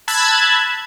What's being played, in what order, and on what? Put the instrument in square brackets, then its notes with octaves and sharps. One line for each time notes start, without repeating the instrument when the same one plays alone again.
[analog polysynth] A5 B5 E6 F#6 G#6